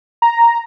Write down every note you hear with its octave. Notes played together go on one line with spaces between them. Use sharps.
A#5